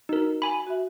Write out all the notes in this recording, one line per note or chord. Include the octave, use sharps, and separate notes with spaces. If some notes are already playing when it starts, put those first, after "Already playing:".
D#4 F#4 A#4
G#5 B5
F#4 E5